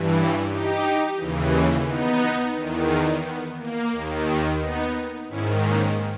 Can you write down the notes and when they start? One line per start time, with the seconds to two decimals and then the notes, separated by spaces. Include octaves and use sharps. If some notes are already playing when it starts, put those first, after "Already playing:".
Already playing: G2 E3
0.14 C#4 E4
0.49 D#4 G4
1.17 D#2 C#3 E3
1.85 B3 D#4
2.55 E2 D#3
3.23 B3
3.57 A#3
3.92 D#2 D#3
4.60 B3 D#4
5.29 G#2 D#3 C#4 E4
5.63 A#3 C#4